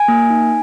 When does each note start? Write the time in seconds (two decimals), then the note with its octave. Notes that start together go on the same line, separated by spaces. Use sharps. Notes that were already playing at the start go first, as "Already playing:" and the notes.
Already playing: G#5
0.08 A#3
0.30 D#4